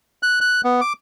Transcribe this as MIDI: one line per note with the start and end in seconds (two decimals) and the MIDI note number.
0.23 0.39 90
0.41 0.61 90
0.64 0.81 59
0.81 0.93 86